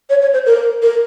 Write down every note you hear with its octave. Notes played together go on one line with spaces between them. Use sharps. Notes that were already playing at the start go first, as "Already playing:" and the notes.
C#5
C#5
C5
A#4
A#4